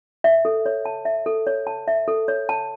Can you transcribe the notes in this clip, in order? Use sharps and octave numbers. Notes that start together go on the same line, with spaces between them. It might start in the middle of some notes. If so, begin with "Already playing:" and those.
E5
A4
C#5
A5
E5
A4
C#5
A5
E5
A4
C#5
A5